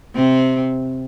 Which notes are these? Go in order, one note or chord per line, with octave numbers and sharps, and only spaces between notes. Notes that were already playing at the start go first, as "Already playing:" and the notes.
C3 C4